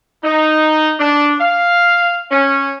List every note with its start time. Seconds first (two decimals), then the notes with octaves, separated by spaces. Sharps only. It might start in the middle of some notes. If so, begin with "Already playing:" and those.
0.24 D#4
1.00 D4
1.40 F5
2.31 C#4